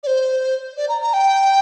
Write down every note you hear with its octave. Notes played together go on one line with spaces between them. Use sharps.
D5
C5
D5
A#5
A#5
G5